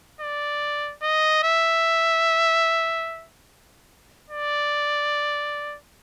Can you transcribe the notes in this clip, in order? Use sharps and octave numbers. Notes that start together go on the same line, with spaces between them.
D5
D#5
E5
D5